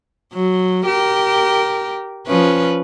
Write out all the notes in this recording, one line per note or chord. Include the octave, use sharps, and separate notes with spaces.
F#3
G4 A#4
F3 C#4 B4